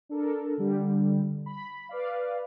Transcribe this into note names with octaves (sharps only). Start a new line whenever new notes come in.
D4 A4 A#4
D3 G3
B5
B4 D5 F5